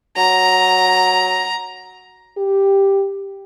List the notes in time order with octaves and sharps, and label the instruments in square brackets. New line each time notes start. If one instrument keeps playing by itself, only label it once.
[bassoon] F#3 [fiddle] A#5
[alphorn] G4